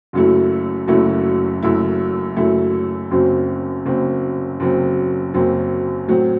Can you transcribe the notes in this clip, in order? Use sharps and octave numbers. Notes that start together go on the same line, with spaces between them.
F#1 F#2 F#3 A3 E4
F#1 F#2 F#3 A3 E4
F#1 F#2 F#3 A3 E4
F#1 F#2 F#3 A3 E4
F#1 F#2 F#3 C4
F#1 F#2 F#3 C4
F#1 F#2 F#3 C4
F#1 F#2 F#3 C4
A2 F#3 C4 F#4